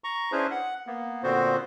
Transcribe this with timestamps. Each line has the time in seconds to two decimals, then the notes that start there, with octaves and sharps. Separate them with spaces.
0.04 A#5 C#6
0.32 C#4 D4 E4 G#4 B4 C5
0.51 F#5
0.87 A#3 B3
1.23 A#2 D3 B3 C4 F#4 C5